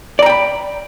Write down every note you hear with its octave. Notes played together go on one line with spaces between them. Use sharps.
D5 G5 A#5 B5